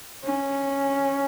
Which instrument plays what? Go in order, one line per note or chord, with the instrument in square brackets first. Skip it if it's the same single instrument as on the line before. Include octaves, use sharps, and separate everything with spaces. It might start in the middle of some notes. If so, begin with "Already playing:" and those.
[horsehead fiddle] C#4